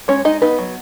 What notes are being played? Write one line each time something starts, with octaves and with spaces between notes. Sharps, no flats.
G#3 C#4 C#5
G#3 D#4 D#5
B3 D#4 B4
F#3